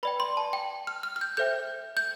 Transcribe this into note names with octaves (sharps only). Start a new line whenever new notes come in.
B4 D5 G5 B5
C6
A5
G5
F6
F6
F6
G6
A4 C5 E5 G5 G6
G6